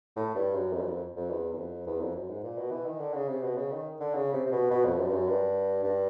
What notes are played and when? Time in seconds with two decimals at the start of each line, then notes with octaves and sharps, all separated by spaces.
0.16 A2
0.35 G2
0.54 F#2
0.73 F2
0.81 F#2
0.88 F2
1.16 F2
1.30 E2
1.53 E2
1.58 F2
1.87 E2
2.01 F2
2.15 F#2
2.29 G#2
2.43 A#2
2.58 B2
2.71 E3
2.86 D#3
3.00 D3
3.14 C#3
3.28 C3
3.43 B2
3.57 C#3
3.72 D#3
4.00 D3
4.14 C#3
4.33 C3
4.46 C3
4.51 B2
4.71 B2
4.85 F2
4.99 F#2
5.08 G2
5.13 F#2
5.28 G2
5.84 G2